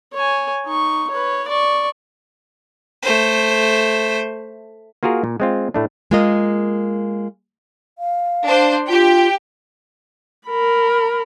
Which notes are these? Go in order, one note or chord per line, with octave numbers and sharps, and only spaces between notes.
C#5 G#5
D#4 C#6
B4 C#5
D5 C#6
A3 C5
A#3 F4 F#4 G#4 A#4
A#2
G#3 C4 F4
A2 A3 D4
G#3 A#3 F4 A#4 D#5
F5
D4 C5
F4 G4 G5
A#4 B5